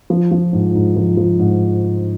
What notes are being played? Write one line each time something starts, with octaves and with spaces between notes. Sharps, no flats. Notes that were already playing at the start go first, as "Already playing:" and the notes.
F3
F3
G#2
G#2
F3
F3
G#2